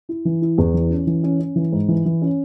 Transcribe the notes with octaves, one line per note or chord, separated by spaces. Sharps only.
E4
E3
E4
E2
E3
C#4
E3
C#4
C#4
E3
G#2
E3
E3
C#4